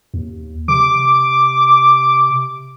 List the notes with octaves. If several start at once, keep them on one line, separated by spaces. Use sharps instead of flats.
D#2
C3 D6